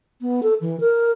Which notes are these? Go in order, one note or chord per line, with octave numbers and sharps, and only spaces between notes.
B3
A4
E3
A#4